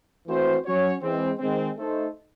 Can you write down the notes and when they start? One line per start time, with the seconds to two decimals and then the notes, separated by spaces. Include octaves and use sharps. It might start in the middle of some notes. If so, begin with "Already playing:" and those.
0.27 E3 A3 C4 F#4 C5
0.65 F#3 C#4 F#4 C#5
1.02 E3 G#3 C4
1.39 D#3 G#3 C4
1.77 A3 D#4 A4 C5